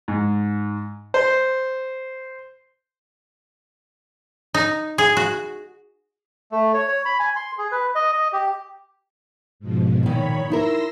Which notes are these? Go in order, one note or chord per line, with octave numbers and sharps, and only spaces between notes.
G#2
C5
D#4
G#4
F#4
A3
C#5
C#5
B5
G#5
C6
G#4
B4
D#5
D#5
G4
G#2 B2 F3
A#2 D#3 C#5 B5
D#4 E4 A#4 C6 E6 A#6